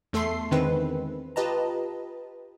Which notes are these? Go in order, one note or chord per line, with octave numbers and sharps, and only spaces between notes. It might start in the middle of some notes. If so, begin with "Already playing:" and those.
E2 A3 A4 E5 C6 C7
E2 D3 D#3 G#3 C4 B4
F4 G4 B4 D#5 A5 A#5